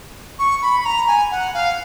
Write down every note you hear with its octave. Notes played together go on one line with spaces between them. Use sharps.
C#6
B5
B5
A#5
G#5
F#5
F5